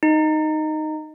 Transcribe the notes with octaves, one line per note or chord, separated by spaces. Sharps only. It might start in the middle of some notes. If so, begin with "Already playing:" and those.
D#4